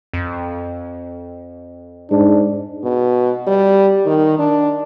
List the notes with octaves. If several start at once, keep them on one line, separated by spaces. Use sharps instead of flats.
F2
G#2 D4
B2
G3
D#3
D4